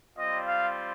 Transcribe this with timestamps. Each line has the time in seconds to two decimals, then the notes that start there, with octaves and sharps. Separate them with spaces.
0.17 G3 C4 F4 D#5
0.46 F5